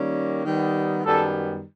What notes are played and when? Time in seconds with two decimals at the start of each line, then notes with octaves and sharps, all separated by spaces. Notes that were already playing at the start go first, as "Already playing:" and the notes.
Already playing: D#3 G3 A#3 C#4
0.45 D#3 G3 B3
1.05 F#2 D#3 G3 B3 A4